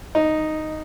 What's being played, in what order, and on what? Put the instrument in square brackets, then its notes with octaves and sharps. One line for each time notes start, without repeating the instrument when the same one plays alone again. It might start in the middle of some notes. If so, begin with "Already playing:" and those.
[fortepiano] D#4